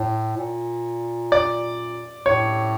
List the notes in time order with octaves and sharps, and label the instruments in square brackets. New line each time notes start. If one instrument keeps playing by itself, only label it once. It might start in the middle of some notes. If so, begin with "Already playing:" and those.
Already playing: [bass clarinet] A2
A#2
[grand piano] D5
[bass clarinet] A2 [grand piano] C#5